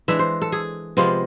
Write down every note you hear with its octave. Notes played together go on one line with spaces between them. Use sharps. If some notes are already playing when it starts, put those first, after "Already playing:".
E3 G#3 D4 E5
C5
A4
G#4
C3 F3 G#3 B3 F4